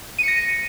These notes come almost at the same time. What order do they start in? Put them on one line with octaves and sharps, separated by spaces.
D#7 C#7 A#6